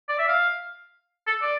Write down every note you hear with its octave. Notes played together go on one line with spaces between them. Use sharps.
D5
E5
F5
A4
D5